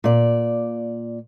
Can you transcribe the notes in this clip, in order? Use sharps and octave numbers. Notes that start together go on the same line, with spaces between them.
A#2 D5